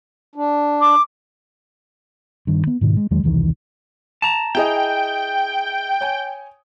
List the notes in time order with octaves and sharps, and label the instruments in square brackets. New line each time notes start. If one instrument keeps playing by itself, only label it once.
[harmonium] D4
[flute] D6
[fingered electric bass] G2 D#3
B3
G#2 B2 D#3
G#3
E2 D#3 F#3 G#3
E1 C2 D#3 E3
[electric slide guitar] A5 A#5
[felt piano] E4 G#4 D#5 [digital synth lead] G5
[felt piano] C#5 G#5